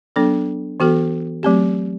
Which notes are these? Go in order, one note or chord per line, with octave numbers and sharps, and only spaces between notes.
F#3 B3 D4 A4
E3 B3 F#4 A4
F#3 A3 C4 G4